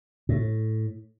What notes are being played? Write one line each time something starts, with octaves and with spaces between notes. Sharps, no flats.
A2